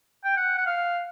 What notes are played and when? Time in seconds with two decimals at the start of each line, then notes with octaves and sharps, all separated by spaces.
0.25 G5
0.37 F#5
0.58 F#5
0.67 F5